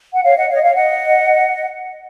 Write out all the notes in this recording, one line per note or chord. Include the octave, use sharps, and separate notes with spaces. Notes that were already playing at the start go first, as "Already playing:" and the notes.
F#5
C#5 F5
D#5 F#5
C#5 F5
D#5
C#5 F5
D#5 F#5